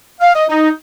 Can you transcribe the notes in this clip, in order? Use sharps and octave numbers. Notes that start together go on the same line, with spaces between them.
F5
D#5
D#4